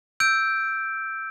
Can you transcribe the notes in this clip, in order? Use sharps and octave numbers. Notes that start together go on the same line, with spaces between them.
E6 G6 D7